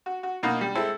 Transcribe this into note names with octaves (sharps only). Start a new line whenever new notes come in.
F#4
F#4
B2 A#3 D#4 F#4
G3
G#3 C4 E4 A4 C5